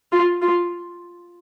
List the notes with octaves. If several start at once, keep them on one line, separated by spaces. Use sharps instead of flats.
F4
F4